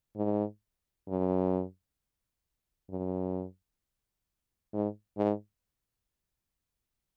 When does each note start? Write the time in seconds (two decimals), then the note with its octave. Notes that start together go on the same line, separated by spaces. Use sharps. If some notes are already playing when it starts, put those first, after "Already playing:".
0.16 G#2
1.08 F#2
2.90 F#2
4.73 G#2
5.18 G#2